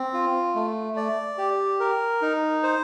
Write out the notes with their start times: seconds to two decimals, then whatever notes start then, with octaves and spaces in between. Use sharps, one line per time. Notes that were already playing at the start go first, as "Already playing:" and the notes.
Already playing: C4
0.13 F4
0.55 A3
0.97 D5
1.38 G4
1.80 A#4
2.22 D#4
2.63 C5